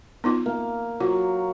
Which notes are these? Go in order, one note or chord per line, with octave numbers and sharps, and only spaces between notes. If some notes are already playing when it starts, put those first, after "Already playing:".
B3 D#4 F4
A#3
F#3 F4